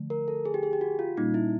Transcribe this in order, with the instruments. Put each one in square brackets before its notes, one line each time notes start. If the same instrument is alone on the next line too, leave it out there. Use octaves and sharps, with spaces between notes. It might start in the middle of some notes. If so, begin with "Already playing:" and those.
Already playing: [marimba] D3 F3 A3
[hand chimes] A#4
A4
G#4
G4
G#4
G4
F#4
F4
[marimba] A#2 G3 A#3 C#4 [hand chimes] D#4
[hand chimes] E4